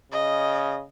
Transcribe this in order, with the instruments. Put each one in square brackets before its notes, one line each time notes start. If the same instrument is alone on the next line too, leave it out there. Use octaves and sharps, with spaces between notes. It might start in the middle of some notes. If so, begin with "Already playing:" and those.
[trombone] C#3 [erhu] D#5